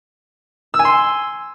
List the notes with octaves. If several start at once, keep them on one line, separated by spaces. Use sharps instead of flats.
E6
G#5
C6